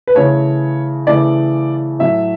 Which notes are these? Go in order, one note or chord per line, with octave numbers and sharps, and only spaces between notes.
B4
C#3 E3 A3 C#5
C#3 E3 A3 D5
A2 F#3 A3 E5